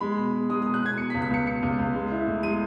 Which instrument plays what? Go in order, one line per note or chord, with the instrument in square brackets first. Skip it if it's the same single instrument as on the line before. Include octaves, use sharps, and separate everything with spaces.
[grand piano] G#3 B5
B2
G#3
G#3 D#6
B2 D#6
F#6
B2 G#6
B2 C#7
B6
C#2
B6
C#2 C#7
B2 C#7
C#2
C#2
G#3
E4
A2
G#3 D#7